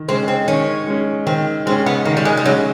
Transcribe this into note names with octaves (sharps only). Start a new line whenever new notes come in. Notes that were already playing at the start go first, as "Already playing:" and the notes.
Already playing: D#3
G#3 C4 C#4
C4
D#3 C#4
G#3 C#4
D#3 C4
G#3 C4 C#4
B3
D#3 A#3
G3
G#3
G3
F#3 G#3 C#4